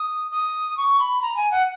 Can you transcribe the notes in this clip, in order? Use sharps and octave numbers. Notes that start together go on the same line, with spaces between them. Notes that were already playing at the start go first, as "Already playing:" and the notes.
Already playing: D#6
D#6
C#6
B5
A#5
G#5
F#5